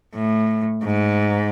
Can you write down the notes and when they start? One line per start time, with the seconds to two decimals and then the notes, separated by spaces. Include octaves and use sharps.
0.15 A2
0.84 G#2